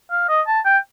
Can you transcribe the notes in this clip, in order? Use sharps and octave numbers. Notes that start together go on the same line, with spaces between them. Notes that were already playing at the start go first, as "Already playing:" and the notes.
F5
D#5
A5
G5